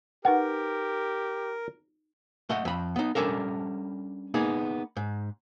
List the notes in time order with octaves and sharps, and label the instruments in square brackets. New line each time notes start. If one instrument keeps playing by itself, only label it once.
[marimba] D#4 B4 G5 [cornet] G4 [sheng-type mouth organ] A#4 [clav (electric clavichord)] F#5
[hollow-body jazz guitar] A3 D#5 F#5
F2 B5
B3 D#4
G3 C#4 D4 A4 A#4
A#3 B3 D#4 G#4
G#2